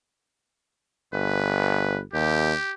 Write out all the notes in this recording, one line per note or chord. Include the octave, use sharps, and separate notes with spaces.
G1 B4
D#2 G4